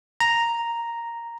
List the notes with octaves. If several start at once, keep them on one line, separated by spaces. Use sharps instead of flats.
A#5